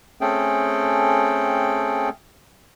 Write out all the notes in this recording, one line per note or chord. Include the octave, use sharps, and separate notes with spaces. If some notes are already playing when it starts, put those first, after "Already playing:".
A3 C4 C#4 G#4 A4 G5